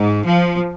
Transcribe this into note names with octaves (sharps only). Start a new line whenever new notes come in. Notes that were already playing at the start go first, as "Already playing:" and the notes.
Already playing: G#2
F3